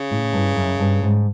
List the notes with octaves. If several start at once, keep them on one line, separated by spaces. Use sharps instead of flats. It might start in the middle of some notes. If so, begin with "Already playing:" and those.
Already playing: C#3
A2
G2
F#2
G2
G#2